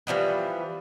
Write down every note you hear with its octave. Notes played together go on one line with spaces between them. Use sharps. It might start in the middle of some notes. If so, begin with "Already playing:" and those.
E3 F3 G3 B3